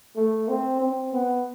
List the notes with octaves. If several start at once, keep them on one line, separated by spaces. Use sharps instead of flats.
A3
C4
C4
B3